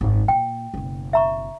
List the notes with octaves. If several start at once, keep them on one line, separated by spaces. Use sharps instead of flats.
G#1 F#2
A#2 G5
F#1 B2
E5 A#5 C#6